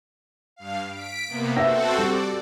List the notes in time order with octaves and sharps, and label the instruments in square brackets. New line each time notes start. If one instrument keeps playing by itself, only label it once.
[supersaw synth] G2 F5
B6 D7
C3 A#3 B3
[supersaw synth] C4 F#4 A4 [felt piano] B4 E5 A#6
[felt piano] G3 [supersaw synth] D5